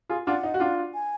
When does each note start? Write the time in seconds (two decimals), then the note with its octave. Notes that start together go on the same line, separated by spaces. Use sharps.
0.09 F4 G#4
0.27 D4 F4 F#5
0.43 D#4
0.54 F#4
0.60 D4 F4
0.94 G#5